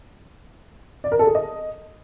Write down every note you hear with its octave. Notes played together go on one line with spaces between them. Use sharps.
D5
A#4
A4
G#4
D#5